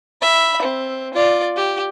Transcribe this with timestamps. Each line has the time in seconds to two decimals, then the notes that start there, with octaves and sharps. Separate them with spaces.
0.21 E5 B5
0.62 C4
1.14 F4 D5
1.56 G4